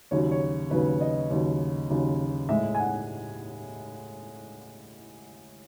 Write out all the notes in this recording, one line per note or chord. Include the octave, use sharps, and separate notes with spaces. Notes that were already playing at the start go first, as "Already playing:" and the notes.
D#2 C#3 F#3 C#5
C#5
D#2 C#3 F#3 B4
D#5
D#2 C#3 F#3
D#2 C#3 F#3
A2 G#3 E5
G#5
F#5